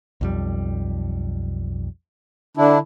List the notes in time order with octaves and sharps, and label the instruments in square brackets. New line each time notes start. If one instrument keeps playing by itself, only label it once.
[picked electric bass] B1 F2 G3
[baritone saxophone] D3 [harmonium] D4 E4